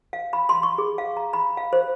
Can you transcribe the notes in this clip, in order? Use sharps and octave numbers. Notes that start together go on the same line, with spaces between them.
F5
B5
C6
C#6
G#4
F5
A#5
B5
F5
C5